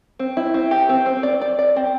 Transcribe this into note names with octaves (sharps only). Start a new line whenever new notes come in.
C4
E4
C4
G4
C4
C4
D5
D5
D5
C4